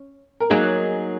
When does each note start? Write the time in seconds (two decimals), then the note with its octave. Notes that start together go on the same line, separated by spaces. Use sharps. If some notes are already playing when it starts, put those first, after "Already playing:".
Already playing: C#4
0.40 A#4
0.50 F#3 A#3 D#4 G#4